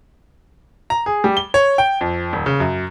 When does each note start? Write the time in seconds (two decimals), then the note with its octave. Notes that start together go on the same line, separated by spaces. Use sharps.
0.90 A#5
1.06 G#4
1.24 G3
1.37 G7
1.54 C#5
1.78 G5
2.01 F2
2.33 D#1
2.46 C#3
2.60 F#2